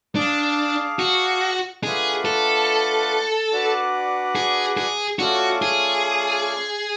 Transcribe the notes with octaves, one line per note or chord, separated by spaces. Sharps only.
D4 G#4 D5 F5 A5
F#4
A3 D4 F4 G#4 B4 F#5
A4
D4 F#4 B4 D5 F#5
G#4
G#4
A3 C#4 F4 F#4 A4 D5
G#4